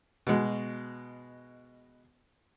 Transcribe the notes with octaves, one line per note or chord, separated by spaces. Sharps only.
B2 G#3